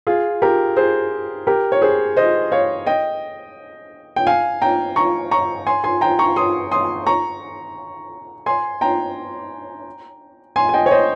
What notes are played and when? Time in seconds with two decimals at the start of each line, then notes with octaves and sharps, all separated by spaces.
0.07 F4 G#4
0.42 G4 A#4
0.76 G#4 C5
1.47 G4 A#4
1.72 C#5
1.82 G#4 C5
2.17 C5 D#5
2.52 C#5 F5
2.86 D#5 G5
4.16 G5
4.27 F5 G#5
4.62 G5 A#5
4.96 A#5 C#6
5.31 A#5 C#6
5.66 G#5 C6
5.84 G#5 C6
6.01 G5 A#5
6.19 A#5 C#6
6.36 C6 D#6
6.72 C6 D#6
7.07 A#5 C#6
8.46 G#5 C6
8.81 G5 A#5
10.56 G#5 C6
10.69 G#5
10.74 D#5 G5
10.86 C#5
10.91 C5 D#5